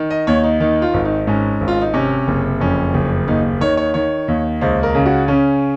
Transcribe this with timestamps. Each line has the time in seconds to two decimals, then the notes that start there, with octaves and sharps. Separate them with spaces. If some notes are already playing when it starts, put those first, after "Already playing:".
Already playing: D#3
0.10 D#5
0.27 D#2 C#5
0.43 D#4
0.60 D#3 D#4
0.82 F4
0.94 G#1
1.05 D#4
1.27 G#2 C#4
1.61 G#1
1.68 F4
1.81 D#4
1.94 C3 C#4
2.28 F#1
2.60 F2 C#4
2.94 F#1
3.27 D#2 D#4
3.61 D#3 C#5
3.77 C#5
3.94 D#3 C#5
4.28 D#2
4.61 C#2 C5
4.83 A#4
4.95 C#3
5.06 F#4
5.28 C#3 C#4